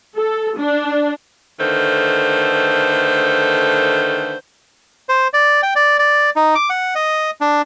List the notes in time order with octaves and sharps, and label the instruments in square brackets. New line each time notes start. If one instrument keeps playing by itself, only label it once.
[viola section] A4
D4
[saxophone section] D3 D#3 A3 B4 C5
[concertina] C5
D5
G5
D5
D5
D#4
D6
F#5
D#5
D4